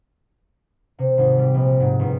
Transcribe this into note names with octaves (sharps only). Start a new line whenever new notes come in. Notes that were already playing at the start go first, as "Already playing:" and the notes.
C3
G#1
G3
A#1
G#2
G1